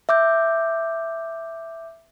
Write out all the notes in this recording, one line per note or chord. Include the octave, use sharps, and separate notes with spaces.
E5 D6 G6